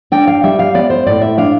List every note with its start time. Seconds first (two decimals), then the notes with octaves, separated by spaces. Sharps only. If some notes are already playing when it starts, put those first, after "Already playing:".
0.12 D4 G5
0.27 F5
0.43 G3 E5
0.59 F5
0.74 B3 D5
0.90 C5
1.07 A2 D5
1.22 E5
1.38 D4 F5